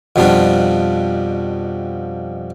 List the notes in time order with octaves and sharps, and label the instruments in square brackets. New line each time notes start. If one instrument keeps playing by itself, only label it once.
[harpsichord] F2 B2 F3 G3 D4